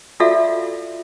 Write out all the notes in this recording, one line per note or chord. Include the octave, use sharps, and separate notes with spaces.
F4 F#4 A4 D5 E5 F5